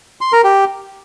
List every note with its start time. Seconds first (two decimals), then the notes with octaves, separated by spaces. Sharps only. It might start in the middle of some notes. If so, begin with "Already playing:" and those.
0.21 C6
0.32 A#4
0.44 G4